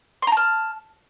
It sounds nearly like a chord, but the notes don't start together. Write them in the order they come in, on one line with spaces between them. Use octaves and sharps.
C6 A#5 A5 F6